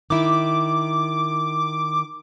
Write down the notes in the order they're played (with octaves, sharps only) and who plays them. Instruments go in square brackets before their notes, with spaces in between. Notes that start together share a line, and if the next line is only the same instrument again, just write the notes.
[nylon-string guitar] D#3 E4 [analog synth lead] D6